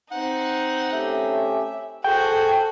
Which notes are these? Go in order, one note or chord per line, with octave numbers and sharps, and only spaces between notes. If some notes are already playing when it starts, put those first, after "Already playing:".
C4 D#4 F#5
A3 C#4 G4 E5
F#4 G#4 A4 C5 G5